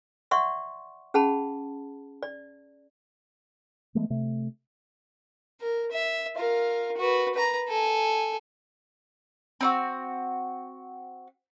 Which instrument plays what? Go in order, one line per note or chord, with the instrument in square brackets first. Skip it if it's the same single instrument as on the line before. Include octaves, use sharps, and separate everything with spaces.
[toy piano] D5 E5 F#5 C6 C#6
C#4 G#4 F#5 A5 B5
D5
[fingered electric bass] E3 G#3 A3 B3
C3 A3
[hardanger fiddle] A#4
E5
F4 A#4
F#4 B4
B4 A#5
A4 G#5
[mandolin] C4 D#4 F#4